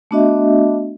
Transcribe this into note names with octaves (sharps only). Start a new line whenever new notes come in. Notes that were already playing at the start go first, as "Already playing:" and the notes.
A3 B3 D4 F#4 D#5 E5